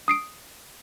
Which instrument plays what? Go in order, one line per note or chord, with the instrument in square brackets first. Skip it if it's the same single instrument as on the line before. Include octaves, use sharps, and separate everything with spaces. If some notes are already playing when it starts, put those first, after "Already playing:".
[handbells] D#6 C7 D7